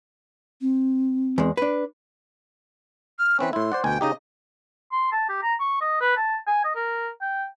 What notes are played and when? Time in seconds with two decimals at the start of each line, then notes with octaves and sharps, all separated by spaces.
0.61 C4
1.38 E2 G#3
1.57 D4 B4
3.18 F6
3.39 E3 C4 C#4 B4
3.53 A2 E4 C6
3.72 C5 D5 F#5
3.84 D2 B2 G5 G#5
4.01 C#3 D#4 G4 D#5
4.92 C6
5.12 A5
5.29 G4
5.43 A#5
5.60 C#6
5.81 D#5
6.01 B4
6.17 A5
6.47 G#5
6.65 D#5
6.76 A#4
7.21 G5